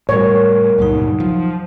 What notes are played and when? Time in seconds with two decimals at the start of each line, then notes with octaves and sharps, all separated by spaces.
0.09 A2 G3 A#4 C#5
0.78 C#2 G2 A#2 F#3 D#4
1.20 F3